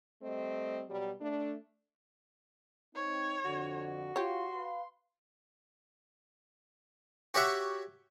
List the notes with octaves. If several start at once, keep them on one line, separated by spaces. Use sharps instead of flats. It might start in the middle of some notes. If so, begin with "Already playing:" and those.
G3 A3 C4 D#5
B2 F#3 G3
A3 D4
C4 D#4 C#5
F2 D3 F#4
F4 G4 C#5 C6
B4 F5
F#4 G4 C#5 E5 F#5